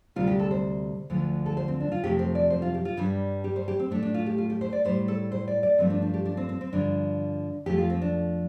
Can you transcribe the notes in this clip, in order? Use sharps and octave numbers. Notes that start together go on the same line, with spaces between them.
D2 C3 G3 F4
G4
A4
C5
D2 D3 F3
A4
C5
C4
D4
F4
F2 C3 F3 A3 G4
C5
D5
C5
F4
G4
F4
G2 G3 D4
G4
C5
G4
C4
A2 A3 D4
D4
F4
G4
F4
G4
C5
D5
A2 G3 C5
A4
C5
D5
D5
G2 F3 A3 C4
D4
D4
G4
D4
C4
C4
C4
G2 D3 F3 D4
F2 F3 A3 G4
F4
C4
D4